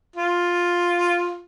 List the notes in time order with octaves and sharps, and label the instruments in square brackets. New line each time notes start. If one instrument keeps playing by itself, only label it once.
[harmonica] F4